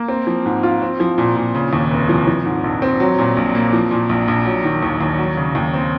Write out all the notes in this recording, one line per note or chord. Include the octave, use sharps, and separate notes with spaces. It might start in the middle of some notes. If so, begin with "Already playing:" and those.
Already playing: A#3
C4
F3
G#2
F4
C4
F3
A#2
A#2
C#3
D#2
F1
F3
F3
G#2
A#1
C4
F#3
A#2
A#1
A#3
F3
A#2
A#1
A#1
F#3
D#3
D#2
D#2
F#3
C#3
D#2
C4